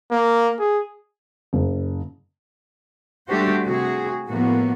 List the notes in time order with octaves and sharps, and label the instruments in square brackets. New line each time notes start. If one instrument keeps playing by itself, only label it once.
[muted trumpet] A#3
G#4
[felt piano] F#1
[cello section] G3 A3 D4 F#4 G4 C5
C3 F#4 G#4
A2 F3 A#3 B3 F#4